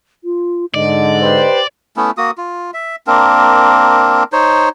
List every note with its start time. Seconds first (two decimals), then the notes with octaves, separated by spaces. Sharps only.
0.24 F4
0.74 G#2 D3 D5 D#5
1.22 G4 B4 C5
1.97 A3 B3 C#4 E4
2.18 A#3 F#4 D#6
2.38 F4
2.74 E5
3.07 A#3 C4 D4 A#4
4.32 D#4 C5 C#5